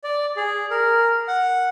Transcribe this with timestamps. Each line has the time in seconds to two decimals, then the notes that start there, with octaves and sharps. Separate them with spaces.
0.04 D5
0.36 G#4
0.71 A#4
1.28 F#5